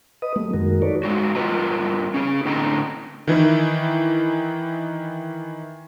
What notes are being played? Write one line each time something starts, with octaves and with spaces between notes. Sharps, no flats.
B4 D#5 D#6
F#3 G3 A3 A#3
F#2 D#3 G#3 F#4 A#4
D#4 F#4 A4 B4 C#5 D5
G#2 G#3 F#4
G2 F4 A#4 B4 D#5 A#5
C#4 G#4
A2 D3 C4 D#5 G5 A#5
D#3 E3 D#4 E4